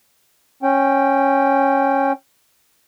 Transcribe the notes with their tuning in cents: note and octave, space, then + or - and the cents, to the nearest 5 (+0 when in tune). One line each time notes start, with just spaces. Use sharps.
C#4 -10 G5 +0